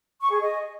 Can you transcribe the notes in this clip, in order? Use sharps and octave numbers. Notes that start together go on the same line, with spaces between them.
C#6
G#4
D#5